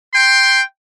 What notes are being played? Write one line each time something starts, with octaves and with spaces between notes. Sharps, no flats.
G5 C6